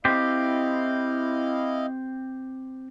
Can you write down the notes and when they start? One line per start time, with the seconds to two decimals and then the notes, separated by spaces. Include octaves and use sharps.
0.05 C4 E4 G4 D#5 F5